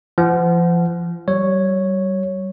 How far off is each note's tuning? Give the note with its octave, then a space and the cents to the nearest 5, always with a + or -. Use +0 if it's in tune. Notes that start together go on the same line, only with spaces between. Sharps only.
F3 -35 F#5 +0
G3 -30 C#5 +0